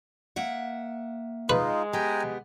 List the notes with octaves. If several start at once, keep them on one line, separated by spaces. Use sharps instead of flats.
A#3 E5 F#5
G#3 D#4 F4 B4
B3 G4 G5 G#5 A#5